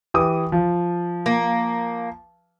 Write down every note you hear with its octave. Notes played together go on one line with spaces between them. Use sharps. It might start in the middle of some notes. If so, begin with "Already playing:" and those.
E3 G4 D#6
F3
A#3